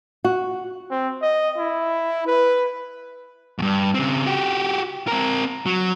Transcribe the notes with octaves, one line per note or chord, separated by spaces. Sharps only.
F#4
C4
D#5
E4
B4
E2 G2
C#3 C4
F#4 G4
C4 A#4
F#3